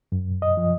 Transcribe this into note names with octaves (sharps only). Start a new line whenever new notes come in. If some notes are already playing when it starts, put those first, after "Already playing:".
F#2
D#5
F3